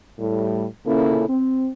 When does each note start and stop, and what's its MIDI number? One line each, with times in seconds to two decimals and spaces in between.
0.19 0.65 45
0.19 0.65 55
0.86 1.26 46
0.86 1.26 49
0.86 1.26 58
0.86 1.26 61
0.86 1.26 64
0.86 1.26 69
1.28 1.69 60